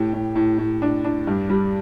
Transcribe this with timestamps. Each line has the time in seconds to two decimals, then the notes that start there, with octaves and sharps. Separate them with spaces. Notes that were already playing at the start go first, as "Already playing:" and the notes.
Already playing: A2 G4
0.13 A2
0.35 A2
0.58 A2
0.82 D4
1.05 D4
1.27 G2
1.49 G3